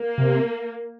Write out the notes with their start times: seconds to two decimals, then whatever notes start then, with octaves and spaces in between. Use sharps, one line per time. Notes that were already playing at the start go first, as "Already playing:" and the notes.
Already playing: A#3
0.18 C3